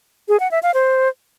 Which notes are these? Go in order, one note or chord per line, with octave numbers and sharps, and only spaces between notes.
G#4
F#5
E5
F5
C5